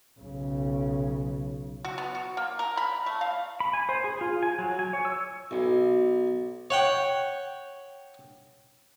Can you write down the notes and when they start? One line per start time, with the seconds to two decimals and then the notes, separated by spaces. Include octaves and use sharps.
0.20 B1 C#3
1.85 F#4
1.98 B3
2.15 F#4
2.37 A#3
2.59 A#4
2.77 B5
3.06 A3
3.21 F5
3.60 B5
3.73 G#5
3.89 C5
4.04 G#4
4.21 F4
4.43 G#5
4.58 F#3
4.79 G#5
4.93 C#5
5.05 E6
5.51 B1
6.70 C#5 F#5 G5